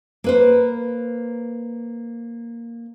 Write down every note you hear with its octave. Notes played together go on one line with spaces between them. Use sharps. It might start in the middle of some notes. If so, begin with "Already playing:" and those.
A#3 B4 C5